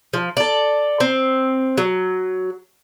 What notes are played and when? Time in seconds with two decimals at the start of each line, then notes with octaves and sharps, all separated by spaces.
0.13 F3
0.37 A4 D5
1.00 C4
1.78 F#3